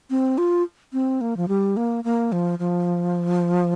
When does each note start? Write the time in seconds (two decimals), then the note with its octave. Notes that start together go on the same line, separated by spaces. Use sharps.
0.10 C4
0.38 F4
0.93 C4
1.21 A#3
1.37 F3
1.48 G3
1.77 A#3
2.04 A#3
2.32 F3
2.59 F3